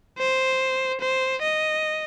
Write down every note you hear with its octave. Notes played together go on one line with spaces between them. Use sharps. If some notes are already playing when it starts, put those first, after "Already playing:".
C5
C5
D#5